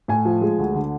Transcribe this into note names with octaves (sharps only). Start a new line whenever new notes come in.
A2 G#5
F3
G#3
D2
D3